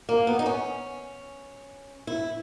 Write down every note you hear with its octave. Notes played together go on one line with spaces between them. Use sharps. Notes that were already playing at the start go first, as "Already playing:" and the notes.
A#3
B3
D#4
C#4
E4